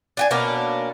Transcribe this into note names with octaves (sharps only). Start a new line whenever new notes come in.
D4 F#5 G#5
B2 A#3 C#4 D4